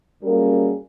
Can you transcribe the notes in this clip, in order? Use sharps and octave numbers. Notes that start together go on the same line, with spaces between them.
F#2 G3 A#3 C#4 G#4 A#4